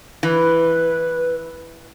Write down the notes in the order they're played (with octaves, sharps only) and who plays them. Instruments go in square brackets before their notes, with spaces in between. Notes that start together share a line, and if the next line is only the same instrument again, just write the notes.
[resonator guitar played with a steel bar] E3 [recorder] B4